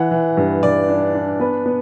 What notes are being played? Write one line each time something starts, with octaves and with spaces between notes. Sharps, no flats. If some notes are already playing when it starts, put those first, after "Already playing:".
Already playing: E3 F#5
E3
G2
G2 D5
D4
D4
B3 B4
B3